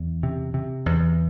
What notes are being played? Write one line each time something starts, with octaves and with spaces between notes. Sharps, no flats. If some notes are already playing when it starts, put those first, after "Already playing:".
Already playing: E2
C3
C3
E2